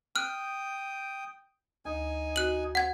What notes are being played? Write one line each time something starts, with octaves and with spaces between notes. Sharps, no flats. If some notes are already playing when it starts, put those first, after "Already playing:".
G5 D#6 F6 F#6
D2 D#4 G#5
F#4 F#6 F#7
F#5 G#6